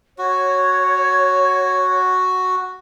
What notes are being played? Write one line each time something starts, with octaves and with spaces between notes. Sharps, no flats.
F#4 C#5